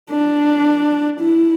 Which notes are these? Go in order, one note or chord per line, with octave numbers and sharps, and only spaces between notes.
D4
E4